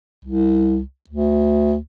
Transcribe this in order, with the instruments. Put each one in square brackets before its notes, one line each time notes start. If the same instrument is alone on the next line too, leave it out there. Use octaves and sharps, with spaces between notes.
[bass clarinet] C2
D2